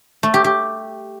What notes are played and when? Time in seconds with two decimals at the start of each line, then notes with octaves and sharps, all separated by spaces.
0.23 A3
0.34 G4
0.44 G4